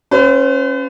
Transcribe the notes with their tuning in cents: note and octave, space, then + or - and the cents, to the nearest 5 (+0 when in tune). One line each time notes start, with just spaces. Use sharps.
C#4 -15 F4 +10 B4 +45